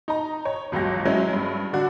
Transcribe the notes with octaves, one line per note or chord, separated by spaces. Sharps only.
D#4 A#5
C#5
G1 C#2 F#3 G4 A#6
F#3 G#3 C#4 E4
G2
D3 D4 F#4